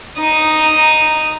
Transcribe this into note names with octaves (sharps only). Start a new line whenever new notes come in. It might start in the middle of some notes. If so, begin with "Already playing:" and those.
D#4 D#6